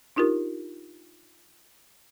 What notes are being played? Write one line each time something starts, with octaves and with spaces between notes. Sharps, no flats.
D4 D#4 F4 G4 A#4